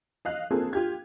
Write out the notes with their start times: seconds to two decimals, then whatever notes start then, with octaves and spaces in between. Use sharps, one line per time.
0.25 D#5 F5 F#6
0.51 A#3 C4 F4 G#4 A4
0.73 F4 G4 G#6